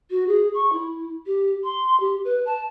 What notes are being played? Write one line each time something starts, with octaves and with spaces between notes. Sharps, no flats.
F#4
G#4
C#6
E4
G4
C6
G4
B4
A5